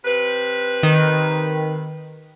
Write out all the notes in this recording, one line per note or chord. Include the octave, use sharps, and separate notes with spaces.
C3 B4
D#3